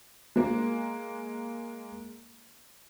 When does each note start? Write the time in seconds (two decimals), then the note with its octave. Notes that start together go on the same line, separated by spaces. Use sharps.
0.36 G#3 A#3